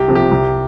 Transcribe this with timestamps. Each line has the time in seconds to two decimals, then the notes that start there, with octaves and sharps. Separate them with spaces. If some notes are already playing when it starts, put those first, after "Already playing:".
Already playing: C2 G4
0.08 C3 F3
0.15 G4
0.31 C2